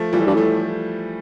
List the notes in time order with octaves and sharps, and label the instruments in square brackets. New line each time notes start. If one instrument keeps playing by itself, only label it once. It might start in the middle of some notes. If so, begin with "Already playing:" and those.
Already playing: [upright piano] F3 A3
[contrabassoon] A#2 [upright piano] E3 G3
[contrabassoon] A2
G2
[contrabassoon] A2 [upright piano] F3 A3